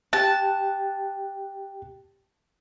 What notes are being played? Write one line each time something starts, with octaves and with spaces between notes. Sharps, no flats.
G4 G5 A5 F#6